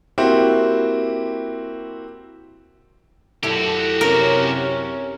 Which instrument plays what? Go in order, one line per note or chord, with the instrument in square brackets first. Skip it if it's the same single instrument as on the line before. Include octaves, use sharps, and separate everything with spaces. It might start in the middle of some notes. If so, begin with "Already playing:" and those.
[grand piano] A#3 C4 E4 F#4 G4
[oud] F#2 E4 A4 [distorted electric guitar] F#4 G4
[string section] C3 C#4 [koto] A#4